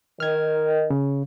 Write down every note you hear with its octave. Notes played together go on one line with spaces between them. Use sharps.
D#3 F6 G#6
C#3